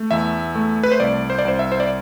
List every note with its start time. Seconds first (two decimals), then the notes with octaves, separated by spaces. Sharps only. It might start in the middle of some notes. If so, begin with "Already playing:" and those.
Already playing: A3
0.11 E2 E5
0.55 A3
0.83 B4
0.92 C5
1.00 C2 D5
1.30 C5
1.39 D5
1.45 C2 C5
1.59 E5
1.72 C5
1.80 D5